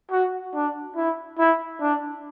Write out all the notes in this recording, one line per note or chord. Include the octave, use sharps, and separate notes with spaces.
F#4
D4
E4
E4
D4